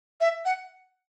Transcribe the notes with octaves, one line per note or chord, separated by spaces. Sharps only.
E5
F#5